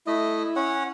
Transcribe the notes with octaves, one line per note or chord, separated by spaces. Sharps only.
A3 E4 D#5
C#4 C#5 F#5